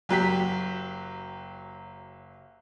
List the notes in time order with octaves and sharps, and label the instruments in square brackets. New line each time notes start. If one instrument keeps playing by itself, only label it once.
[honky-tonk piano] F#1 F#3 G4 B6